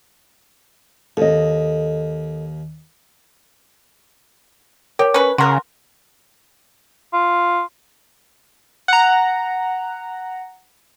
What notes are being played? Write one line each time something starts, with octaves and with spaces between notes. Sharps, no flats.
D#2 A4 D#5
G4 A#4 C#5
C#4 B4
C#3 F#4 A#4 C6
F4
F#5 A#5